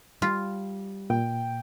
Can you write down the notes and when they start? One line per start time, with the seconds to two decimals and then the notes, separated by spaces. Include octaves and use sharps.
0.22 G3 F4
1.10 A#2 G5